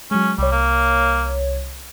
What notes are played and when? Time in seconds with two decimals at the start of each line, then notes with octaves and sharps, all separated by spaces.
0.11 F#3 G#3 C#4
0.38 C2 G3 C#5
0.52 A#3